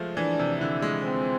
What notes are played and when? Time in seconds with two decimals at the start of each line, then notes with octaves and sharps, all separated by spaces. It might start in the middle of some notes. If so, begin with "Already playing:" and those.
Already playing: F3 G#3 A3
0.17 E3 D4
0.39 C3
0.61 D3 E4
0.82 G#3
1.05 C4